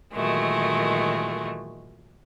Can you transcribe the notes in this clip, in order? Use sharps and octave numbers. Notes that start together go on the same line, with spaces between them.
A#2 D#3 E3 F#3 G#3 A3